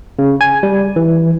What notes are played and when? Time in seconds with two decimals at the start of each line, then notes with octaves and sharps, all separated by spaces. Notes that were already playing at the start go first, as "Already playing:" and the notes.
0.19 C#3
0.41 G#5
0.63 G3
0.96 E3